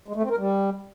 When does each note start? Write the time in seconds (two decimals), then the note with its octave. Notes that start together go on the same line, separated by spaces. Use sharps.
0.08 G#3
0.16 A3
0.23 C4
0.30 A#4
0.38 G3